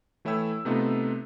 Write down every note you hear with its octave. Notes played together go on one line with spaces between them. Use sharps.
E3 A3 E4 C#5 G5 E6
C3 A3 B3 D#4 F4